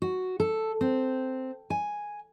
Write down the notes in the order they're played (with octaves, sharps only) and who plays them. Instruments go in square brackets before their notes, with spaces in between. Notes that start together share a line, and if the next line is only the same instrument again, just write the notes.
[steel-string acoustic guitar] F#4
A4
C4
G#5